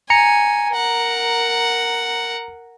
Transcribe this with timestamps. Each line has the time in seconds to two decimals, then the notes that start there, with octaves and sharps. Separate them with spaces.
0.10 G#5 A#5 C#7
0.74 A#4 F#5